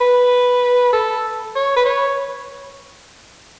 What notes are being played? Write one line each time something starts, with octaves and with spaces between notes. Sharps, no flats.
B4
A4
C#5
B4
C#5